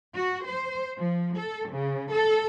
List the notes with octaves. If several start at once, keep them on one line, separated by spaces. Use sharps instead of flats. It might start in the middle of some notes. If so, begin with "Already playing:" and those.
F#4
C5
F3
A4
C#3
A4